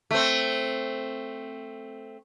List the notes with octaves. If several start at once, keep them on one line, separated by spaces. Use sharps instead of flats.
A3 C4